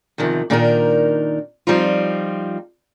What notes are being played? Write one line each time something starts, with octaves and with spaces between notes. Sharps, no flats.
E2 C3 D#3 F3
A#2 D#3 D4 D#4 A4 A#4
F3 G3 C4 D#4 F4